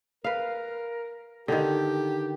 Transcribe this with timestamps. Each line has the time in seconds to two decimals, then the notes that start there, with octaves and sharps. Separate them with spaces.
0.24 A#4 B4 F5
1.48 D3 D#3 G4